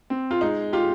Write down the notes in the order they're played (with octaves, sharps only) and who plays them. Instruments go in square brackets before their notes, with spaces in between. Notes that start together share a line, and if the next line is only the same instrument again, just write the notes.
[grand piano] C4
[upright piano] F4
[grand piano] G#3 [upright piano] D#4
[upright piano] F4 [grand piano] G4